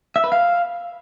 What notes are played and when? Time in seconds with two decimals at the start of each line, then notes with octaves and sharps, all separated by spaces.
0.16 E5
0.24 B4
0.32 F5